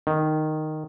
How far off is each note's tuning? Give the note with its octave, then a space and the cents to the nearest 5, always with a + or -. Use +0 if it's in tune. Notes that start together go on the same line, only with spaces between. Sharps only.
D#3 -5